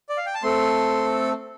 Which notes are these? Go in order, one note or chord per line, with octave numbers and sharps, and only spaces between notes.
D5
F5
G5
A5
A3 C4 A4 C6